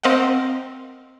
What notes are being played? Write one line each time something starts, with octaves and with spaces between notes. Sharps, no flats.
C4 A#4 D#5 F5 F#5